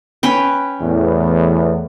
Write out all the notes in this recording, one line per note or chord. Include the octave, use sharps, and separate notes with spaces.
C#4 B4 G5
E2 A2